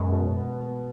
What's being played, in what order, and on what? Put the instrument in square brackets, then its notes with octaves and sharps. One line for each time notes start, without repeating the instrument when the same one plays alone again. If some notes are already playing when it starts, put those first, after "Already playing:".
Already playing: [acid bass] F#2 [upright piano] B2 G#3 B3
[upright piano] B2
B3
B3